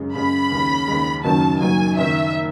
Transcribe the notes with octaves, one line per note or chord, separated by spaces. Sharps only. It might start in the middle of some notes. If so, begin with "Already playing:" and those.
Already playing: F#2 C#3 G#3
F#2 C#3 G#3 B5
D#2 C#3 G#3
D#2 C#3 G#3
F#1 F#2 D#3 F#3 A5
F#1 F#2 D#3 F#3 G#5
F#1 F#2 D#3 E5